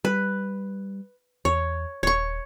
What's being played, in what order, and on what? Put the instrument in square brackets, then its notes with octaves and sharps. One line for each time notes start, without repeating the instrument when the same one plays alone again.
[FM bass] G3 [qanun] B4
[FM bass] E2 [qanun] C#5
[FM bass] D#1 [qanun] C#5 C#6